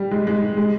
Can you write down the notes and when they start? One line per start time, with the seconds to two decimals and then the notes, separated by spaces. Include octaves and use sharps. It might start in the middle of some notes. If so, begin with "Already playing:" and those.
Already playing: G3
0.11 G#3
0.27 G#3
0.57 G#3